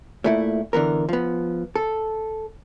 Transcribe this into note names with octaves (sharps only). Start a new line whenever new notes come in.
A#2 A3 E4
D3 E3 B3 A#4
F3 B3
A4